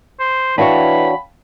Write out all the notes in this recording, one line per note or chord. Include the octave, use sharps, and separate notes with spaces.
C5
E3 D4 F#4 C#5 F5 G5 A5 B5